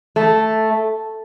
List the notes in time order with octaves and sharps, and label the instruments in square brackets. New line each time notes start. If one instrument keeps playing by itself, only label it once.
[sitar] A3